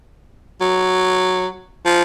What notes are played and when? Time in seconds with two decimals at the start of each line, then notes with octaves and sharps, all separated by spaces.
0.61 F#3
1.86 F3